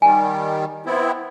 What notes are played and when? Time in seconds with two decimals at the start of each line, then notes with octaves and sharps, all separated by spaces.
0.02 D#3 G3 G#5
0.86 B3 C4 E4